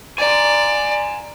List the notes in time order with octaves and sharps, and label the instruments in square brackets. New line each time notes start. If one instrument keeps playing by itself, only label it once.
[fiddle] D5 [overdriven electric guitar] G#5 A#5